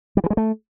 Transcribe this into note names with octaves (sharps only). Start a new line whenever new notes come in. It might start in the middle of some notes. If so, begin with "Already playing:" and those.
G3
E3
G#3
A3